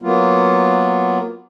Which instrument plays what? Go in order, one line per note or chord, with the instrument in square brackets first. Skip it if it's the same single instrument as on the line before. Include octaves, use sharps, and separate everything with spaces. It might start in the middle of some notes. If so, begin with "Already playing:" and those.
[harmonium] F#3 A#3 B3 F4